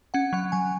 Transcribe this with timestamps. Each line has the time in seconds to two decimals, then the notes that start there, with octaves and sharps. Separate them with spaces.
0.14 C#4 F#5
0.33 F#3 F#5
0.52 F#3 G#5